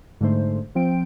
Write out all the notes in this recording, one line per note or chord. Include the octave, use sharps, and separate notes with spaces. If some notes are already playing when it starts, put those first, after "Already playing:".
G#2 D3 A3 C5
F3 C4 G5 D7